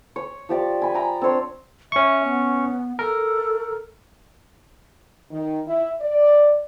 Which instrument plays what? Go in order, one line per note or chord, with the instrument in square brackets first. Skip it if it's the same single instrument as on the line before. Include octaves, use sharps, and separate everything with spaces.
[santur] C#5
F3 G4 D5
G#5 B5
G5 A#5 B5
C4 D4 C#5 C6
[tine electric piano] C#4 C#6 [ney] E5
[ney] B3
[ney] A4 [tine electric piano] A#4
[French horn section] D#3
E4
D5